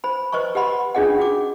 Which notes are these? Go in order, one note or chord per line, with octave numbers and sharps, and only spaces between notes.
C5 B5
B4 C5 D#5 A#5 C#6
G4 D#5 F#5 B5 C6
C#4 D4 F4 G#4 D#5 F#5
F#4 D6